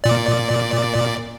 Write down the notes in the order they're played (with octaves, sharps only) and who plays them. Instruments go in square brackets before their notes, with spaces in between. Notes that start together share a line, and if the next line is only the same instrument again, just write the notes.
[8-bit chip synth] A#2 D5